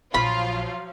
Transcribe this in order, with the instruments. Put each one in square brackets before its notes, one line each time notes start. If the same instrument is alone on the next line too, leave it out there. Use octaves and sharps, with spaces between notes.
[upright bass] A#1 [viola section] F3 F#3 F5 [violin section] F4 [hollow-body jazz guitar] B5